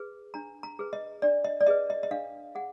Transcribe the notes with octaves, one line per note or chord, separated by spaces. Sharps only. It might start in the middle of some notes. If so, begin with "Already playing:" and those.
Already playing: G#4 B4
D4 A#5
A#5
G#4 B4
D#5
D4 D5
D#5
D5
G#4 B4 D#5
D#5
D#5
D4 F5
G#4 F#5